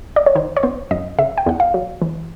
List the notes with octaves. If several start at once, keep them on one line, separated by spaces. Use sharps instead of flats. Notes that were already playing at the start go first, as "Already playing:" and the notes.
D5
C#5
D#3 C5
C#5
B3 C5
F#2 D#5
C#3 E5
G5
E2 F#5
F5
F#3
E3